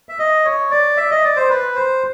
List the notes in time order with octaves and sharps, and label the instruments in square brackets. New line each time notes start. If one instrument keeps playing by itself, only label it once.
[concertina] E5
D#5
C#5
D5
E5
D#5
D5
C5
B4
C5